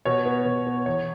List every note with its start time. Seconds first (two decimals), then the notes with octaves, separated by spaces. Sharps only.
0.05 B2 C#5
0.25 B3
0.45 B2
0.67 B3
0.86 E2 C#5